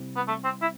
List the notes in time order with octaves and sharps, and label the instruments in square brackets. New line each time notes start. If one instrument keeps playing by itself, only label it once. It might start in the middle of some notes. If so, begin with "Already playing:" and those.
Already playing: [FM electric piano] C3 G3 C4 E4
[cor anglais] B3
A3
C4
E4